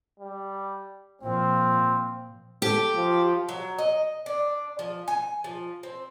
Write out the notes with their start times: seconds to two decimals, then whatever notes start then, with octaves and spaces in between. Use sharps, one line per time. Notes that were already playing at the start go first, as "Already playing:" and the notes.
0.19 G3
1.21 A#2 F3 C4
2.62 G4 A4
2.95 F3
3.49 F#3
3.78 D#5
4.26 D4
4.79 F3
5.08 G#5
5.44 F3
5.83 C4